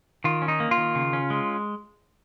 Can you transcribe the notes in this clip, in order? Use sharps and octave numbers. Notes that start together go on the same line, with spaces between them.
D#3 F4
C#4
D#4
A#3
F4
D#3
C#3
C#4
G#3